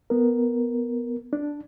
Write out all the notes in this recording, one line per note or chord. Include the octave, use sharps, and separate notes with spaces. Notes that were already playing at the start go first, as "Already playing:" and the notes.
B3 A#4
D4